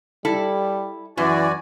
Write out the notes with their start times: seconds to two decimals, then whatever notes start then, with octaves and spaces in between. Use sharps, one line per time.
0.25 G3 E4 A4
1.18 F#2 E3 F#4 D5 G#5